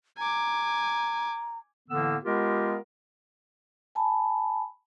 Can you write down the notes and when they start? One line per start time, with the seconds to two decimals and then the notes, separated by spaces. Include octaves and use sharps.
0.18 G#5 A#5 D6
1.88 A2 D3 E3 A#3 B3 E6
2.24 G#3 B3 F4 G4 A#4
3.95 G#5 A5 B5